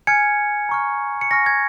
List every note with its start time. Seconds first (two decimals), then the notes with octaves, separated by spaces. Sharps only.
0.07 G#5 F6 G#6 C#7
0.69 A#5 C#6 F6
1.21 C#7
1.31 G#5 C#6 F6 A#6
1.46 G#6